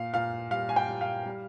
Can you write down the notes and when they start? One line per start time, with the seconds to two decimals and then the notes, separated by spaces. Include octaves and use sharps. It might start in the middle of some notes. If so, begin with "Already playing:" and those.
Already playing: A#2 F5
0.14 A#2 F5
0.51 G3 F5
0.69 G#5
0.76 G5
0.88 G3
1.01 F5
1.26 G3